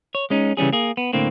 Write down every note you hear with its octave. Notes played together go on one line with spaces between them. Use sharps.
C#5
G#3 C#4 D#4
C#3 E3 G3 C#4 G#4
A#3 G#4
B3
A2 D3 A#3 C4